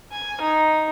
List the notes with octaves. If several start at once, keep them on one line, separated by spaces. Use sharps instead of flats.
G#5
D#4